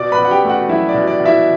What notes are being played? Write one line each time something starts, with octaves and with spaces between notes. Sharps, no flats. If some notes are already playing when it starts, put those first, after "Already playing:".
Already playing: B2 D5 D6
B4 B5
B2
F#5
G4 G5
A3
F#4 F#5
F#3 E4 E5
D5
B2
D5
B2
E4 E5